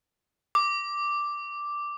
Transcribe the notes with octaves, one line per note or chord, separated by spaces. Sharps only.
D6